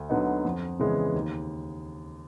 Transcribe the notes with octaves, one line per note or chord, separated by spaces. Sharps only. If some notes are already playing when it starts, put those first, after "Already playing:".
Already playing: D2
D3 F#3 B3 D#4
F2
C#3 E3 G#3 B3
D#2